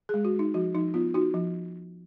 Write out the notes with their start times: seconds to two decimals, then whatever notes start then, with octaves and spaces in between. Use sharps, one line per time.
0.09 G#3 G#4
0.25 F#4
0.35 G#3 D#4
0.54 F3 F#4
0.74 F3 D#4
0.94 B3 F4
1.14 D#4 F#4
1.34 F3